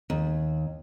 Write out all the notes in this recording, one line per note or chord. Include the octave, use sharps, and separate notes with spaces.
D#2